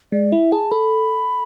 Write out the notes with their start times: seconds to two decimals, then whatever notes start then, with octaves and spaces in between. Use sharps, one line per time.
0.12 G#3 D5
0.32 E4 E5
0.52 G#4 A5
0.71 A4 B5